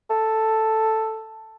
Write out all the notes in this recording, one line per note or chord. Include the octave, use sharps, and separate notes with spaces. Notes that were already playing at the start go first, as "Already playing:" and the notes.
A4